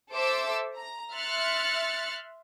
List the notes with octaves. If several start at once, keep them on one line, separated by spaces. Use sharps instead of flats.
A4 C5 E5 D6 E6
A#5
E5 C6 F6 F#6 A6 C#7